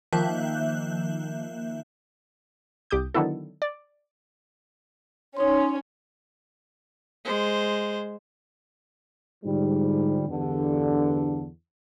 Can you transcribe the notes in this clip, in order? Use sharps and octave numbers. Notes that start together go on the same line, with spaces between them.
D#3 F3 A#3 E5 F#6 G6
C2 G4 D6 D#6 G6
D3 D#3 F#3 B3 E4 A4
D5
C#4 D#4 C#5 C6
G#3 C5
G#2 D3 F3 G3
E2 G2 D3